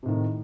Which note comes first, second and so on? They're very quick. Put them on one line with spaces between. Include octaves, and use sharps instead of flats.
C3 A2 D#3